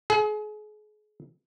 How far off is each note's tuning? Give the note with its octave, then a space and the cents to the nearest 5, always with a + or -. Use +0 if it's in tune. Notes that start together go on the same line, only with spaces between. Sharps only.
G#4 +35